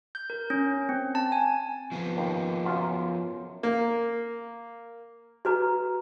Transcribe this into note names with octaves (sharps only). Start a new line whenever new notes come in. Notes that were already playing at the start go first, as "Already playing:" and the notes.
G6
A#4
C#4
C4
A5
G#5
F3 B3
D#2
F#2 F4
A#3
F#4 B4 A#5